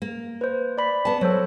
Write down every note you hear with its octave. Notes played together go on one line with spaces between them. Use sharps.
A#3
B4 C5
D5 B5 B6
B3 A5
F#3 A4 C5 C#5